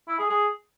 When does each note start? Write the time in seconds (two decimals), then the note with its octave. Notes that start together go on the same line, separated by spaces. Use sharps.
0.08 E4
0.19 G#4
0.30 G#4